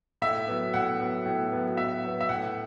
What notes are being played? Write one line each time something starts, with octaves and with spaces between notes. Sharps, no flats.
A2 E5
F#3 B3
A2 F#5
F#3 B3
A2
F#3 B3
A2 E5
F#3 B3
E5
A2 F#5